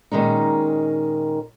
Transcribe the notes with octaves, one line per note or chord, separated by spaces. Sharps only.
A#2 D#3 G#3 C#4 D#4